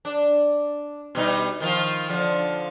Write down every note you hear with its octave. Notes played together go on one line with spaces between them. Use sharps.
D4
B2 G3 D#4
D#3 F3 F4
D3 F3